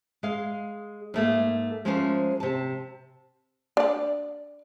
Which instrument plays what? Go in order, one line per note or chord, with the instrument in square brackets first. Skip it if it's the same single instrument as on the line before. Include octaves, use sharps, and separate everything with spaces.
[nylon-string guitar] G#3 F5
G#2 A3 A#3
F3 G#3 A3 C#4 A#4 C5
C3 A5
[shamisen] D4 D5